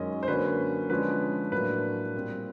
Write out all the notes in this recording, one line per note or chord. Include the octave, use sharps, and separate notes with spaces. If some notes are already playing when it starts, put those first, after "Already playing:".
Already playing: F#2 D#3 G#3 C#4 D#5
C5
D3 F#3 A#3 C#4 B4
D3 F3 G#3 C#4 B4
A2 F#3 A#3 D4 B4
A#2 G3 C4